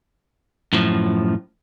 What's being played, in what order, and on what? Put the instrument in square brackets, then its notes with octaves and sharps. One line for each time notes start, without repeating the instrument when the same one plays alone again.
[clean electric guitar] F#2 A2 F3